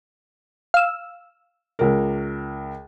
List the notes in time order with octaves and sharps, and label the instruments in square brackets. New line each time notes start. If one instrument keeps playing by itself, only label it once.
[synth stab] F5 E6
[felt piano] C#2 A#4